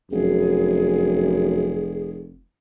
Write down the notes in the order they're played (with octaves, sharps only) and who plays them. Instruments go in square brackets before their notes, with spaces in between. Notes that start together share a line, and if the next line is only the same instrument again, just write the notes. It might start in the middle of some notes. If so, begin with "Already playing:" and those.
[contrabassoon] F1 [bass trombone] F#2 [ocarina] G#4